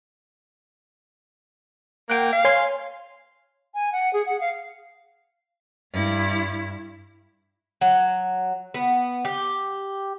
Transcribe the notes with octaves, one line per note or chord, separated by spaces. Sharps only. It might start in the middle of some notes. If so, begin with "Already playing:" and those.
A#3 F#5 G5
F5
C#5 G#5 C6
G#5
F#5
G#4
F#5
F5
G2 E4
F#3
B3
G4